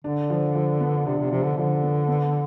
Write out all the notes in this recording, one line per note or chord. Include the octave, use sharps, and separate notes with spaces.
D3 D4
F3
F3
B3
C3 D4
C3
C3 F3
D3
D3 F3
B3
B3